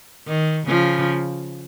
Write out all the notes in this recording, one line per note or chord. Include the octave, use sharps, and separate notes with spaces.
D#3
C#3 F3